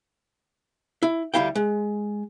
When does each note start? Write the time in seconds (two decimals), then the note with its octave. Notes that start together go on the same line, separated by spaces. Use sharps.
1.03 E4
1.34 D2 G3 G#3 E4 F5 G5
1.55 G#3